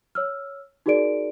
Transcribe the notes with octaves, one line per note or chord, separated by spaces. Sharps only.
C#5 E6 F6
D#4 F#4 G#4 A#4 D5 D7